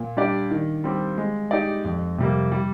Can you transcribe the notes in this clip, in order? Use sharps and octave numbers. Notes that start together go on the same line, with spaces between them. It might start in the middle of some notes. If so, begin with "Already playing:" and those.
Already playing: A#2
G3 D4 G4 D5
D#3
G3 C4 G4
G#3
D#4 G4 D5
F2
C3 G3 A#3
G3